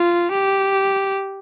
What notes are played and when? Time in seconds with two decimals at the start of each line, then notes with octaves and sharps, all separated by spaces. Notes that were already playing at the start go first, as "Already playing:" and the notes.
Already playing: F4
0.32 G4